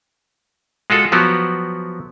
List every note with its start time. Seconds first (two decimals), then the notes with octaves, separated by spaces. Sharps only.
0.90 G#3 F4 F#4 A4
1.12 F3 F#3 B3 F#4 G4